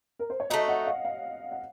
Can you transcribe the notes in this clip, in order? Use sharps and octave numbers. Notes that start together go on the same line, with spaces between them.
A#4
C5
C#5
A3 D#4 F#4 D#5
F#5
F5
F5
F#5